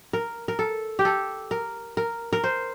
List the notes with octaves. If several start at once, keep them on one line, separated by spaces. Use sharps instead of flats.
A#4
A#4
A4
G4
A4
A#4
A#4
A#4
C5